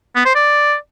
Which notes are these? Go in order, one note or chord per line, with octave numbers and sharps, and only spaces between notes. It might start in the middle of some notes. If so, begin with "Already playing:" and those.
B3
C5
D5